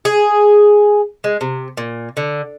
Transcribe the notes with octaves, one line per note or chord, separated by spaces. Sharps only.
G#4
G#3
C3
A#2
D3